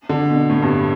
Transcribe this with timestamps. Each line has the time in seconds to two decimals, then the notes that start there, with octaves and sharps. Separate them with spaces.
0.09 D3
0.30 B2
0.50 A2
0.62 G2